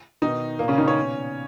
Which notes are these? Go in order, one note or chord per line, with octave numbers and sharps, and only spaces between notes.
B2 D#3 D#4
A#2 A#3
C#3 C#4
D#3 D#4
C#4 C#5
B2